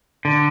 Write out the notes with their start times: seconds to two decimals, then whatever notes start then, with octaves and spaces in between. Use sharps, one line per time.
0.25 D3